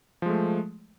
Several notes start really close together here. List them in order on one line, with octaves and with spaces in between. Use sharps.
F3 G#3 A3